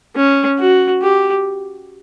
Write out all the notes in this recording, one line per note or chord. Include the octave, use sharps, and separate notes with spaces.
C#4
F#4
G4